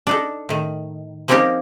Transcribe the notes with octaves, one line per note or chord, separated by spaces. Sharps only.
D4 D#4 A4
A2 D#3
F3 A#3 C4 C#4 D#4 G4